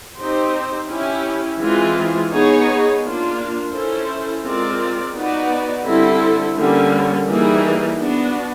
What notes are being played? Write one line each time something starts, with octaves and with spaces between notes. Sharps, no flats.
C4 D#4 G4 C5
C#4 E4 G4
E3 G#3 C4 F4 G#4
B3 D#4 G#4 C#5
A#3 D4 F4
C#4 E4 A4 C5
G#3 C4 F4 A#4 D5
B3 D#4 F#4 B4 D5
D3 G3 C4 E4 A4
D3 G3 A#3 C#4
E3 G3 A#3 D#4 G#4
B3 D4 F#4